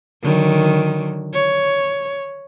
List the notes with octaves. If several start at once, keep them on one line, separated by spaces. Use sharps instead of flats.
D3 D#3 F#3
C#5